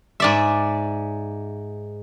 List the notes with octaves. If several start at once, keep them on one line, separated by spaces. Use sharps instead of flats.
G#2 D5 E5